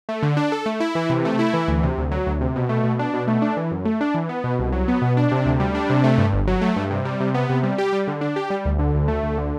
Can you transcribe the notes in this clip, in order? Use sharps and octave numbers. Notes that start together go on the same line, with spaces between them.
A3
D3
D4
A4
A3
E4
E3
C3
A3
E4
E3
D2
C3
D2
F#3
D2
C3
B2
A3
B2
D4
B2
A3
D4
E3
F#2
A3
D4
E3
B3
B2
C2
F#3
B3
B2
D4
C3
D2
G3
D4
C3
A3
G2
G1
F#3
A3
G2
C3
G3
C3
B3
C3
G3
G4
G3
D3
D4
G4
G3
D2
D3
D2
A3
D2
D3